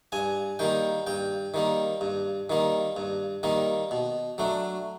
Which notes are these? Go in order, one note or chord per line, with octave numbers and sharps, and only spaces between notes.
G2 G#5
D#3 G3 A#3 G5
G2 G5
D#3 G3 A#3
G2
D#3 G3 A#3
G2
D#3 G3 A#3
B2
F#3 A3 D4